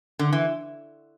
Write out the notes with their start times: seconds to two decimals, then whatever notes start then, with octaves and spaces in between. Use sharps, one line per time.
0.19 D3
0.33 E3